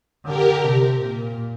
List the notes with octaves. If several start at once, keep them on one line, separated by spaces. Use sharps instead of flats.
D3 G4 A#4
C3
A#2